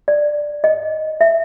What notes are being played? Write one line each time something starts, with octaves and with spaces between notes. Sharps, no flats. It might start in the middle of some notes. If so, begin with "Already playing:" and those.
D5
D#5
E5